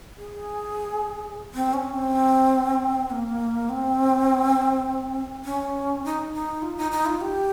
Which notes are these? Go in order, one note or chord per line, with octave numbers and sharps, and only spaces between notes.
G#4
C4
C#4
C4
A#3
C4
C#4
D#4
D#4
F4
D#4
D#4
F4
G4